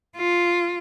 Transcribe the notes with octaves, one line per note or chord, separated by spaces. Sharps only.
F4